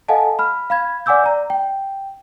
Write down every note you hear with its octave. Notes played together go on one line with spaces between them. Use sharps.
A4 D#5 F5 F#5 G#5 A5
B5 F6
F5 B5 G#6
D5 F#5 G#5 D6 E6 G6
D5 A#5
G5